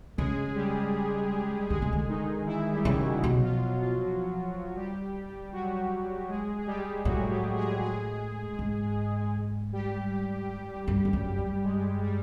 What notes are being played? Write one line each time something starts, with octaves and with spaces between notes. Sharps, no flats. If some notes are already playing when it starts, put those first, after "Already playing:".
C#3 G#3 G#4
G3 G4
D3 G#3 G#4
C#3
D3
D#3 D#4
E3 E4
G3 G4
C#3
F#3 F#4
B2 F#3 F#4
F3 F4
F#3 F#4
F3 F4
F#3 F#4
G3 G4
F#3 F#4
G#3 G#4
G#4
G3 G4
A2 F#3 F#4
G3 G4
G#3 G#4
G#3 G#4
G#2
G3 G4
G2
F2
F#2
G2
G#3 G#4
G3 G4